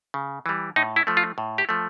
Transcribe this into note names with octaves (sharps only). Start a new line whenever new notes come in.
C#3
E3 G3
A2 D#4
E4
F3 A3
F4
A2
G4
F3 A3